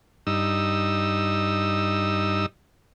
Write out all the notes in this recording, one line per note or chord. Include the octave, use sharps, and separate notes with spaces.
G2 D#4 E6